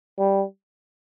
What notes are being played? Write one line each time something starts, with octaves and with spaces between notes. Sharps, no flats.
G3